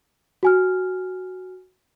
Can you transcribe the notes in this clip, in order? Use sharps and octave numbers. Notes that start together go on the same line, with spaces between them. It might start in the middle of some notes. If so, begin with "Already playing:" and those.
F#4 G#5 F6